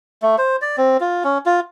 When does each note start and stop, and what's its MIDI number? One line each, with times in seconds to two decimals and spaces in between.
0.22 0.36 57
0.38 0.56 72
0.62 0.76 74
0.78 0.97 60
1.00 1.23 65
1.24 1.38 61
1.46 1.60 65